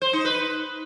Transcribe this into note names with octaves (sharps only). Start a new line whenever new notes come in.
C5
D#4
B4